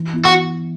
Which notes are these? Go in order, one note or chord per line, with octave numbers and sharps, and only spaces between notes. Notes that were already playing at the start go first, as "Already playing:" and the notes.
Already playing: E3
B3 E4
F#4